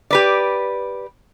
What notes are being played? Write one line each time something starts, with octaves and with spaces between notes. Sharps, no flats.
G4 B4 D5